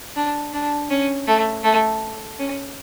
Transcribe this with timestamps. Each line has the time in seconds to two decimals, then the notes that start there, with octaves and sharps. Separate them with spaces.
0.16 D4
0.53 D4
0.90 C#4
1.27 A3
1.64 A3
2.39 C#4